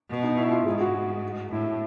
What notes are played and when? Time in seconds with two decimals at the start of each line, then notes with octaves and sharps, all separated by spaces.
0.10 B2
0.23 D#4
0.37 E4
0.51 F4
0.66 G#2 G#4
0.81 F#4
1.51 A2 E4